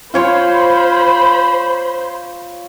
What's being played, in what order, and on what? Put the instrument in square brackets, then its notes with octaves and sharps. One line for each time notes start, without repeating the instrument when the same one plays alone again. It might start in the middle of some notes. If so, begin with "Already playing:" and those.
[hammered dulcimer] F4 C#5 C6 [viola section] C5 [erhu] B5